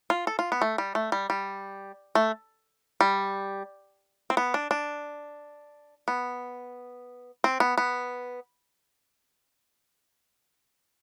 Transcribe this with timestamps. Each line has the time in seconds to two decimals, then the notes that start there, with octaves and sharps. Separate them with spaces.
0.10 F4
0.27 A4
0.39 F4
0.52 B3
0.61 A3
0.78 G3
0.95 A3
1.12 G3
1.30 G3
2.15 A3
3.01 G3
4.30 C4
4.37 B3
4.54 D4
4.71 D4
6.08 B3
7.44 C4
7.60 B3
7.77 B3